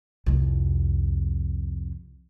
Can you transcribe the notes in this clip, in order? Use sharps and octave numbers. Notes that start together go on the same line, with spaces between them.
C2 F2